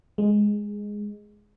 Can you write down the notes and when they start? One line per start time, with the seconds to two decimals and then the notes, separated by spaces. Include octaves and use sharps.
0.18 G#3